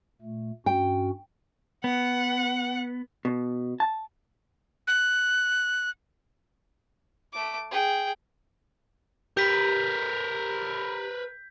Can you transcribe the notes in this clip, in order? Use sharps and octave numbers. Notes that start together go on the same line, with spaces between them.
A#2 A3
G2 C#4 F#4 G5
B3 F#5
B2
A5
F#6
A3 D6
G#4 G5
G4 A#4 B4 G6 B6